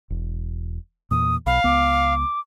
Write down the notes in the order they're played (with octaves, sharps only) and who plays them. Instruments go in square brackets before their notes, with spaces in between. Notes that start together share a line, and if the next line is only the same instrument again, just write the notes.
[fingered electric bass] E1
[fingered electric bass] E2 A#2 [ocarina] D#6
[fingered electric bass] B1 [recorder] F5 [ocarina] B5
[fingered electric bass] C#2 B3 [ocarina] D6